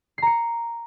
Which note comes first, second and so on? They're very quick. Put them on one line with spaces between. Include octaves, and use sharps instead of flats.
C7 A#5 C#7